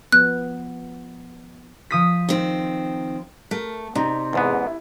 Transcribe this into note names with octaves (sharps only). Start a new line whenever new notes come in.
F3 B3 F#6
F3 D#6 B6
D#3 C4
A3 A#4
C3 D#4 D5 A#5
E2 G#2 B3
E4